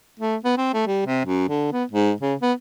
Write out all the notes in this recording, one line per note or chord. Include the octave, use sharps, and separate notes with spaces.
A3
B3
C4
A3
G3
C3
F#2
D3
B3
G#2
C#3
B3